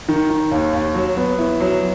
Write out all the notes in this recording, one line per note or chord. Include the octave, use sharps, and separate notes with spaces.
D#3
D#3
D#2
D#2
F#3
B3
E4
F#3